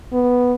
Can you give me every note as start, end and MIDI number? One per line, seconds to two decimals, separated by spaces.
0.13 0.54 59